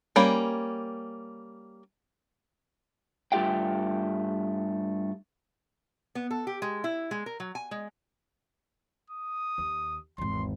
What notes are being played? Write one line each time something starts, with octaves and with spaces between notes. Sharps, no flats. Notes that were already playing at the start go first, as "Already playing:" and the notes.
G3 A#3 C#4 B5
G2 A3 F4 G4 F5 G5
B3
A4
G4
G#3
E4
G#3
A#4
F#3
G#5
G#3
D#6
D#2
G#1 E2 C6